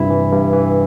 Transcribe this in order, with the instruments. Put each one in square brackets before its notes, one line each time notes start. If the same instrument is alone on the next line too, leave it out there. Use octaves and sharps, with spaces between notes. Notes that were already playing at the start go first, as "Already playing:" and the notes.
Already playing: [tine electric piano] G2 C3 E4
E3
G2
E3